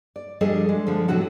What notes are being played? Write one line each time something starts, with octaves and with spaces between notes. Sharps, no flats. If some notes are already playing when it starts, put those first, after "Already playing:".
D5
F3 G3 D4 G#4 A4 D#5
G#3
D3 F3
A2 C3 F#3 F#4 A4 F#5